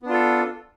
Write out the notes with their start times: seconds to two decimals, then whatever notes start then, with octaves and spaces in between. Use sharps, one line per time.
0.02 B3
0.06 D4
0.09 F4
0.13 A4